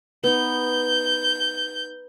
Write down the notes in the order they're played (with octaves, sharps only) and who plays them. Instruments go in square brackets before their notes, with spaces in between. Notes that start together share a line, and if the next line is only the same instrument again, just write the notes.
[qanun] B3 D#4 [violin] G6